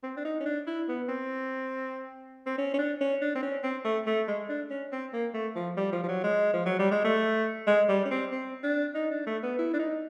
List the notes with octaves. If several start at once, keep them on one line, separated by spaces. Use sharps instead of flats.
C4
D4
D#4
C#4
D4
E4
B3
C4
C4
C#4
C#4
D4
C#4
D4
C4
C#4
C4
A3
A3
G#3
D4
C#4
C4
A#3
A3
F3
G3
F3
F3
F#3
G#3
F3
F#3
G3
G#3
A3
G#3
G3
C#4
C4
C4
D4
D#4
D4
A3
B3
E4
D4
D#4